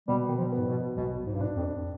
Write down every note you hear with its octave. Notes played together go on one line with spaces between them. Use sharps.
B2 G3
D#3
F3
B3
G#2
B2
B1 B2
G#2
G2
G#2 D4
F2